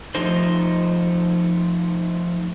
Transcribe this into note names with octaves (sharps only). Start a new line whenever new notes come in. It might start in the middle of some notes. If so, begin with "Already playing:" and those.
F3 A3 D#4 C5